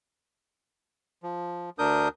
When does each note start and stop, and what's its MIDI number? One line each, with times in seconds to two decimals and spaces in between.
1.23 1.70 53
1.79 2.08 38
1.79 2.08 62
1.79 2.08 70
1.79 2.08 87
1.79 2.08 91